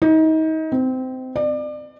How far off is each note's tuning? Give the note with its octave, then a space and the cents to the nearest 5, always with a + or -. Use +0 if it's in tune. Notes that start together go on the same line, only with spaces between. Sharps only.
D#4 +30
C4 -20
D5 +30